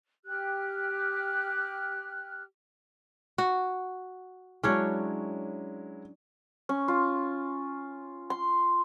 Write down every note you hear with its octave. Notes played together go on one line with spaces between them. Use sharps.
G4 F6 F#6
F#4
F#3 G#3 C#4 D4 E4 C#5
C#4
F4
C6